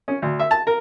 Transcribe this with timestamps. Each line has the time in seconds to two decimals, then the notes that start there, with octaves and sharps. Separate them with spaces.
0.08 C#4
0.22 D2
0.39 E5
0.51 A5
0.67 A#4